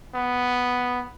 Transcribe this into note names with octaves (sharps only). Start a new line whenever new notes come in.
B3